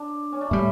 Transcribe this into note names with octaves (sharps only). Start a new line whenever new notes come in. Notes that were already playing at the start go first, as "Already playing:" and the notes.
Already playing: D4
C#4
D4
A2 G3 E4